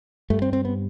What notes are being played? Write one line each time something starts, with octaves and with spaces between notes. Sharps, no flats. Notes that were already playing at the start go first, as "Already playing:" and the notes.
G2 A3
C4
C4
B3